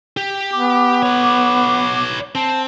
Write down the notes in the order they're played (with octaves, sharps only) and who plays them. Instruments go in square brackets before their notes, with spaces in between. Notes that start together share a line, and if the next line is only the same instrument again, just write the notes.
[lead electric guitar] G4
[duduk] B3 [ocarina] D6
[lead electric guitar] B4 C#5
[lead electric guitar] C4 [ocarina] A5